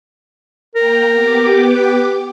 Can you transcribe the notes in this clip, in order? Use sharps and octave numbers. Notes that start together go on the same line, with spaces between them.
A#3 A#4 G5 A#5
B3 G4 D6
B4